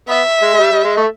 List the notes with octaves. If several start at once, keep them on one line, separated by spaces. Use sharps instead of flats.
B3 E5
G#3
G#3
G3
G3
G#3
A3